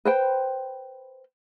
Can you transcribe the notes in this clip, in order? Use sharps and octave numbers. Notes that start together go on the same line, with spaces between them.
B4 C5 G5